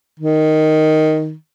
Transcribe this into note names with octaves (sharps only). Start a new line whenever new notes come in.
D#3